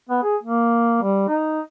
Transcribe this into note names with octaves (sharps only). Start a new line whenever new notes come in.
B3
G#4
A#3
G3
D#4